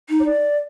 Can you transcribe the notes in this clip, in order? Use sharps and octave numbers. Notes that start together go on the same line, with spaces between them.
D#4
C#5
D5